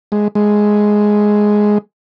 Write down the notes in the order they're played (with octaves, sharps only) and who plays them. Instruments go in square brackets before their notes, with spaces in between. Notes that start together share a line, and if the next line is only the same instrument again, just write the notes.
[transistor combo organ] G#3
G#3